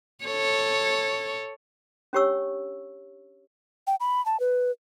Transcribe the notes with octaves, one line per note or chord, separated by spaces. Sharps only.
A4 C#5
C#4 D4 G4 C#5 C#6 E6
G5
B5
A5
B4